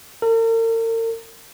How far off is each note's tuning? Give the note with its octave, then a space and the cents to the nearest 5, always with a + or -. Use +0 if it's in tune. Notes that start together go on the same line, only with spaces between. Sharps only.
A#4 -45